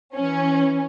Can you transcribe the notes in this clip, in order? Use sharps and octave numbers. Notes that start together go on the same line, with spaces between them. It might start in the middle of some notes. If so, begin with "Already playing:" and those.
E3 C#4